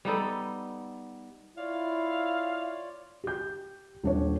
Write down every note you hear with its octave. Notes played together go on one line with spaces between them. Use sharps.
G3 B3 D#4 A4
E4 F4 C#5 D5 F5
G4 G6
D#1 D4 C#5